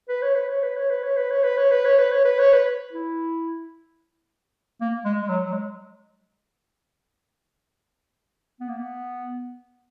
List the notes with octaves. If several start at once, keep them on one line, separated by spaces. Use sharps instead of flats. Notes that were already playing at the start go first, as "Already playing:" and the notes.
B4
C#5
B4
C#5
B4
C#5
B4
C#5
B4
C#5
B4
C#5
B4
C#5
B4
C#5
B4
C#5
B4
E4
A#3
G#3
G#3
F#3
F#3
G#3
B3
A#3
B3